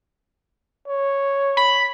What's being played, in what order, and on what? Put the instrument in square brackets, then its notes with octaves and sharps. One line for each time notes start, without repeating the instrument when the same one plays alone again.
[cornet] C#5
[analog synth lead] B5